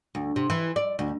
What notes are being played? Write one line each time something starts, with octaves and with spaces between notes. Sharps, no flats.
D2
C3
E3
D5
D2